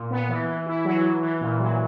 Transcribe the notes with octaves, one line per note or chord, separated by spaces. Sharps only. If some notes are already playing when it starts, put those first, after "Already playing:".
Already playing: A#2
B3
E3
E3
E4
F#3
E3
E3
A#2
F#3